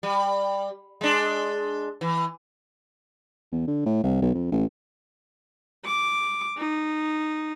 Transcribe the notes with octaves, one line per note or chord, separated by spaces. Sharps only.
G3
G#3 D4
E3
E2
D3
A2
C2
B1
F2
A1
D6
D#4